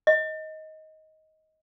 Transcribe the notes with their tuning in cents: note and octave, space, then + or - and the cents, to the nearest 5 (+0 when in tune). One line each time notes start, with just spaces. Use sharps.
D#5 +15